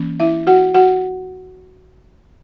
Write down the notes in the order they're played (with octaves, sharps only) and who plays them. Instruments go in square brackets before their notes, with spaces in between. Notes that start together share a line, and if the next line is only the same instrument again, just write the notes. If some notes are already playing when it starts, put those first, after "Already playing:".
Already playing: [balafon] E3 A#3 C#4
E4 E5
F#4 F#5
F#4 F#5